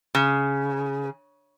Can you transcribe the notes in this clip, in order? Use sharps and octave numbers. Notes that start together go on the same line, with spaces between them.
C#3